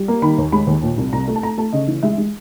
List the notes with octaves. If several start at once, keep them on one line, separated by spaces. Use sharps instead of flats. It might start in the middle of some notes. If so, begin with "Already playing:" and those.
Already playing: G3
A#3
D#3 B5
D#2
G#3 B5
D#2
A#2
C2
C2 A#5
A3
A5
A3 A#5
A3 A5
C#3 D#5
E3
G#3 E5
G#3